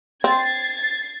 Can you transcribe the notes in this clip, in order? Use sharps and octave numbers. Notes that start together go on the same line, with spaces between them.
C4 G#6 A6 C7